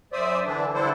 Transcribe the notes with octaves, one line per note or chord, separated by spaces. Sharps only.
F#2 C5 D5 E5 D#6
D3 E3 D4
D3 G3 D4 E4 A4 C5